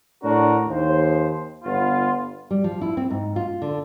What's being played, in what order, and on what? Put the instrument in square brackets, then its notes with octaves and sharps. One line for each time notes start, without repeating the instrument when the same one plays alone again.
[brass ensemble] A2 D4 F#4 A#4
D#2 C5
G1 B3 F4
[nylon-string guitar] G3
F3
E4
C4
G#2
F4
D3